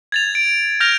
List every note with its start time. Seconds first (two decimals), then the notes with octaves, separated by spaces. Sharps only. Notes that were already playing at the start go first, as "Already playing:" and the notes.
0.12 G#6 A6 F7
0.35 D7
0.80 F6 G6 A#6 F7